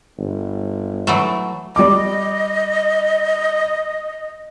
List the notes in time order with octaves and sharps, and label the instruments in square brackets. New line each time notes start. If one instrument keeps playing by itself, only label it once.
[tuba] G1
[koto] E3 F#3 A3
[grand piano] G3 D6 [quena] D#5